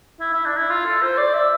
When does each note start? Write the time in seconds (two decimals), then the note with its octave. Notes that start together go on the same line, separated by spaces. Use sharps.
0.20 E4
0.33 E4
0.46 D4
0.57 E4
0.70 F4
0.85 A4
1.02 C5
1.18 D5
1.34 E5